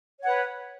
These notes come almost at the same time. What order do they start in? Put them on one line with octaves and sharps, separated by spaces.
C#5 F#5 B4